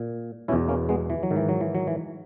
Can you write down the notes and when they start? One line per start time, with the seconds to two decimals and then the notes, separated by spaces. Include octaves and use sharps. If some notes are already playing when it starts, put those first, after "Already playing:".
Already playing: A#2
0.48 E2 B2 C#4 E4
0.68 A#3 C#4
0.89 G#3 B3
1.10 E3
1.23 F#3
1.31 G#2 D#3
1.36 E3
1.49 F#3
1.61 E3
1.75 F#3
1.87 E3